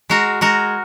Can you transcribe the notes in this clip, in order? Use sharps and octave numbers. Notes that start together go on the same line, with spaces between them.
G#3 F#4 A#4
G#3 F#4 A#4